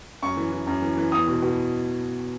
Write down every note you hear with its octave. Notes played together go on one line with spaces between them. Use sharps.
F#2 C#6
E3
E3
F#2
E3
E3
E2 D#6
B2
B2